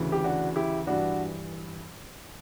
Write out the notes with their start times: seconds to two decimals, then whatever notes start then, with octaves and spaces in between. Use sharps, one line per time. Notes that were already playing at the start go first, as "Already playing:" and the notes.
Already playing: D2 C#3 E3
0.12 G4
0.24 D4 F#4
0.56 E4 G4
0.87 G2 E3 D4 F#4